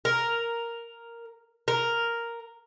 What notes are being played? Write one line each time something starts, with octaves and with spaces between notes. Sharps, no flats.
A#4
A#4